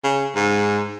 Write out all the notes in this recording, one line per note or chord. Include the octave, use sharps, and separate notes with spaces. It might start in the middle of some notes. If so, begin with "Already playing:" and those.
C#3
G#2